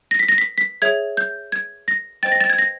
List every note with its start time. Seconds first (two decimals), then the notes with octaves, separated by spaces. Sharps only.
0.11 A#6
0.19 B6
0.29 A#6
0.38 B6
0.58 B6
0.82 G#4 C#5 E5 G#6
1.17 G6
1.52 G#6
1.88 A#6
2.23 C5 D#5 G5 A6
2.32 A#6
2.41 A6
2.50 G#6
2.58 A#6